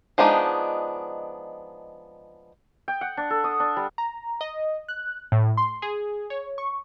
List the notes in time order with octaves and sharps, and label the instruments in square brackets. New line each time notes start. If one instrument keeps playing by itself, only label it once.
[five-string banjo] F3 G#3 B3 D4 D#4
[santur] G5
F#5
D4
A4
D#6
D4
G3
[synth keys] A#5
D#5
F#6
A2
C6
G#4
C#5
C#6